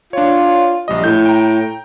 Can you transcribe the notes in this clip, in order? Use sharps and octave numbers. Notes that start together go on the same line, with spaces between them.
D4 F4 C#5
A#1 G3 D#5
A2 G6
G5 A#5